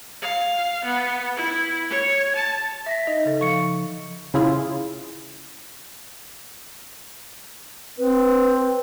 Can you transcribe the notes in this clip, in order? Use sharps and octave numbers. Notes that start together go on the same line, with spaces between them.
F5
B3
E4
C#5
A5
E5 A#6 B6
D#4 D#5
C#3 A4
F3 C#6 C#7
C#3 C#4 E4 F4 G#4
C4 B4